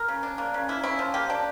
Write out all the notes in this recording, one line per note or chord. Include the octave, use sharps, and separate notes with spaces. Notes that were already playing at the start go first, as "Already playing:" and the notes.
Already playing: A#4
C#3
D4
A#3
C#3
A#3 E4
C#3 E4
F3
A#3 G4
D4